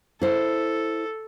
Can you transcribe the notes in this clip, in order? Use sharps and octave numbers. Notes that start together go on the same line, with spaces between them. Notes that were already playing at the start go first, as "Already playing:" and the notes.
E4 A4 C5